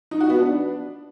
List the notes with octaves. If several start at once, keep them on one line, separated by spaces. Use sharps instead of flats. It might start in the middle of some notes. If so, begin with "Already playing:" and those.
D#4
F#4
B3
D4